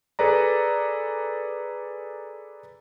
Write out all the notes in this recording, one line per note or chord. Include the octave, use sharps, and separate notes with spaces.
G#4 A4 B4 D5 A#5